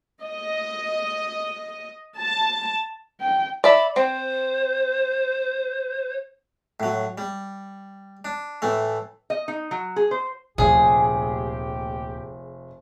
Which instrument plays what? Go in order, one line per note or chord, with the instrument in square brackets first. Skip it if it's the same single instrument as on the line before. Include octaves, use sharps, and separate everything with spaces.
[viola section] D#5
A5
[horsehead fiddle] G5
[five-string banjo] D5 E5 [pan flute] B5
[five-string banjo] C4 [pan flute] C5
[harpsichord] A2 F#3
G3
D4
A2 E3 A3
[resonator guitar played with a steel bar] D#5
D#4
F#3
G#4
C5
[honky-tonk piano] F1 [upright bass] D2 A#2 [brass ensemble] G4 [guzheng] G#4